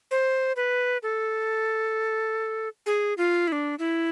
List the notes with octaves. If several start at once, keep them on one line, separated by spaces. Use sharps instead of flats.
C5
B4
A4
G#4
F4
E4
D4
E4